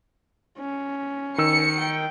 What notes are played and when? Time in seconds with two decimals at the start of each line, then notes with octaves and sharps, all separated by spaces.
0.59 C#4
1.38 D#3 E6 C#7
1.78 G5